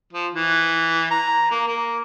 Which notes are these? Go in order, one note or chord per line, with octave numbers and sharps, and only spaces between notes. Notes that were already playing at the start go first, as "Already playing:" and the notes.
F3
E3
A#5
A#3
A#3